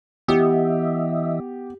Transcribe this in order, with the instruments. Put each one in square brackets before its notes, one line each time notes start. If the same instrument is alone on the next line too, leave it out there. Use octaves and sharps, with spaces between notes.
[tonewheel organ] E3 D#5 E5 [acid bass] B3 [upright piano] G4